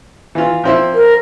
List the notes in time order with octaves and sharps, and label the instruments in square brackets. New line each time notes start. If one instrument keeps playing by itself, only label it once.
[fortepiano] E3 F4
F3 C4 E4
[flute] A#4